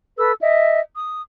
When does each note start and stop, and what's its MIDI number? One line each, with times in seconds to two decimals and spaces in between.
0.18 0.32 69
0.18 0.32 71
0.18 0.32 88
0.41 0.79 75
0.41 0.79 76
0.95 1.21 87